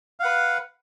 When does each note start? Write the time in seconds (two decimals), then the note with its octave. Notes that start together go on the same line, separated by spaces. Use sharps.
0.20 F5
0.22 F#5
0.25 B4